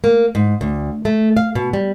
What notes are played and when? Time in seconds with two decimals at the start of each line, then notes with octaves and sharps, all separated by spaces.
0.04 A#3
0.35 G#2
0.61 D2
1.05 A3
1.37 F5
1.55 B2
1.73 G3